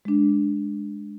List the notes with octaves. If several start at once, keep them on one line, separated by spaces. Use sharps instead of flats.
G#3 D4